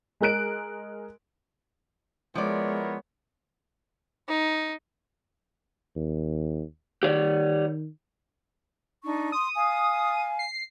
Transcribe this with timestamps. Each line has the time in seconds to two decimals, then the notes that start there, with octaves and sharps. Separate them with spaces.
0.21 G#3 G#4 A#4 F#6 D7
2.35 F3 G#3 B3 E4 A#4 C#5 D5
4.29 D#4
5.96 D#2
7.03 D#3 G4 C#5 D5
9.04 D4 D#4 C#6
9.32 C6 D#6
9.55 F5 G#5
10.39 C7